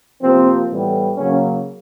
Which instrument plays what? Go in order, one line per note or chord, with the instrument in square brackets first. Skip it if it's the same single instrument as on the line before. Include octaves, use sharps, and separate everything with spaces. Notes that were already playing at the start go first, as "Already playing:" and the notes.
[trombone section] C3 F3 A#3 C4
A2 E3 G3 B3
C#3 F#3 A#3 C#4